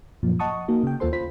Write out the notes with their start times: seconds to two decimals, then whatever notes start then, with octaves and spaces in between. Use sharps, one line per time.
0.23 F#2 A#2 F3
0.39 D#5 F#5 A5 C#6 D#6
0.68 A#3 D#4 F#4
0.83 C#3 G5
1.00 D#2 A#3 F4 A4 C5 C6
1.13 F4 C5 B5 B6